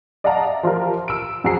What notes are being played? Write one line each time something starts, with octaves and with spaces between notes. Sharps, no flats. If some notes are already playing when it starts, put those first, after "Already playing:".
D5 D#5 F5 F#5 A5 A#5
E5
F3 F4 G4 A#4
E6 D7
F2 F#4 G#4 A#5 C7